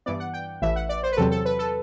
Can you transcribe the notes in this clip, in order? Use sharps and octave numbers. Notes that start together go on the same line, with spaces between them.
G2 E3 B3 D5
F#5
G5
A1 A2 E3 E5
F#5
D5
C5
B4
E2 C3 F#3 C4 A4
A4
B4
A4